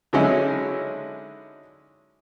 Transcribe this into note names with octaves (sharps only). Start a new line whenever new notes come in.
D3 F#3 G#3 C#4 D#4 E4